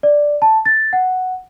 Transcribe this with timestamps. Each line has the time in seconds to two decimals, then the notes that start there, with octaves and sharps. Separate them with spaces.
0.03 D5
0.42 A5
0.65 A6
0.93 F#5